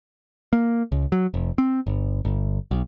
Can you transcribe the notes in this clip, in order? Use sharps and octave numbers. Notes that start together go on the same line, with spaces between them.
A#3
C#2
F#3
F1
C4
G1
G1
B1